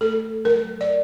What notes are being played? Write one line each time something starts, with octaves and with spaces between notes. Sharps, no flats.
A3 A4
F#3 A#4
D5